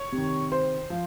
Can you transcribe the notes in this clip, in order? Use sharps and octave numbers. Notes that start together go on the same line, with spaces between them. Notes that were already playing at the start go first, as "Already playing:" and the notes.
Already playing: C#5
C3 D#3
C5
F3